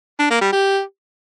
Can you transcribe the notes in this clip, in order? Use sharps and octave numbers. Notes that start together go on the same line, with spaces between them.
D4
A#3
G3
G4